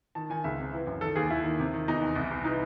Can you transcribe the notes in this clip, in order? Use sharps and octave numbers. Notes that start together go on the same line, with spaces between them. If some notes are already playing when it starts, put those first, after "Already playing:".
D#3 A5
D#3 G#5
C#2 E5
C3
E3
F#2
D#3 A4
D#2 G#4
D#2 E4
D#3
C3
D#3
E2 D#4
E2
C2
C2
E3 D#4